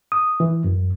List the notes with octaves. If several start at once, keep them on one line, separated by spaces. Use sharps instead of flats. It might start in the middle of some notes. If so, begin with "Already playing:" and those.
D#6
E3
F#2